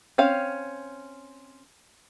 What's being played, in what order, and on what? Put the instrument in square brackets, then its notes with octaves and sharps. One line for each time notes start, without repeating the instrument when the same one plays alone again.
[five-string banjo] C4 C#4 F5